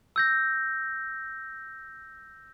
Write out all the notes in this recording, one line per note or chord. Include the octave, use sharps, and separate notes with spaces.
E6 G6 A#6